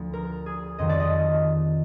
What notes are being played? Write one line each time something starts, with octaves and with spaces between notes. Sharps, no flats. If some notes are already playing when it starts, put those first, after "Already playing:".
Already playing: D2 F3
A#4
G#4
F2 D#3 F#3 D#5
D5
D#5